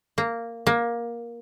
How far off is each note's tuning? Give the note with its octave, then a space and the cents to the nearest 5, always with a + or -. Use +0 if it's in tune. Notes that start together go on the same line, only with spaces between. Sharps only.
A#3 -10
A#3 +15